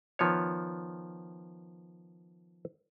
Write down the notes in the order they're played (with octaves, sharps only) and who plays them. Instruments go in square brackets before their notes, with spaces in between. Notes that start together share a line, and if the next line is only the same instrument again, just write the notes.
[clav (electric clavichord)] D#3 F3 B3 C#5